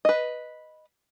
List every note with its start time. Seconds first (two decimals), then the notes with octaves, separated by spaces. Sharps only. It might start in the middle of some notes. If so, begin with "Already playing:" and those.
0.05 B4 D#5